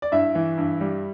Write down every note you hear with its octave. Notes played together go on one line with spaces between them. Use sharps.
D5
G2 E4 E5
E3
G2
G3